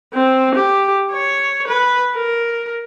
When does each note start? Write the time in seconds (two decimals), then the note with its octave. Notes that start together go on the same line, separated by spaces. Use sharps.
0.14 C4
0.55 G4
1.12 C#5
1.68 B4
2.15 A#4